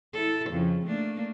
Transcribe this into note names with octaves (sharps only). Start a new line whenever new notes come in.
E4 A4
F2 C#3
A3 A#3 D4